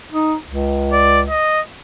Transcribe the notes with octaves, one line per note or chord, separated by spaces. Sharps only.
D#4
C#2
D5
D#5